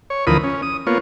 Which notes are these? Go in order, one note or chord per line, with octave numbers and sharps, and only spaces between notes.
C#5
D2 E3 F3 A#4 B5 D#6
C#4
D#6
A#3 B3 F4 C#5